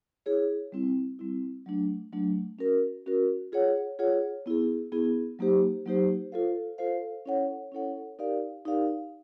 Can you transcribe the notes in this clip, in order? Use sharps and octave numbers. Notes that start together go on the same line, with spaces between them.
E4 G#4 C#5
G3 C4 E4
G3 C4 E4
F#3 A3 D4
F#3 A3 D4
C#4 F#4 A#4
C#4 F#4 A#4
F4 G#4 C#5 F#5
F4 G#4 C#5 F#5
B3 E4 G#4
B3 E4 G#4
F#3 A#3 D#4 G4 C5
F#3 A#3 D#4 G4 C5
F4 A4 C5 F5
F4 A4 C5 F5
C#4 E4 A4 C#5 F#5
C#4 E4 A4 C#5 F#5
D#4 G4 A#4 D5 F5
D#4 G4 A#4 D5 F5